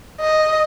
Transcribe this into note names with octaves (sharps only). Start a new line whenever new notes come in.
D#5